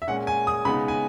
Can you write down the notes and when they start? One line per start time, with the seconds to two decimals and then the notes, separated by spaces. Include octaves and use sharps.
0.02 E5
0.07 A#2 G#3 C#4 F#5
0.27 G#5
0.47 D#6
0.65 C#3 G#3 B3 D#4 B5
0.88 G#5